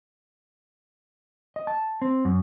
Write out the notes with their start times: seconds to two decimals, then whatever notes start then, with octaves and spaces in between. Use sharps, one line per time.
1.56 D#5
1.67 A5
2.02 C4
2.25 F#2